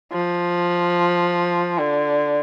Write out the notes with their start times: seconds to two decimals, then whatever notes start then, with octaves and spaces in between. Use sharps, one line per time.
0.12 F3
1.79 D3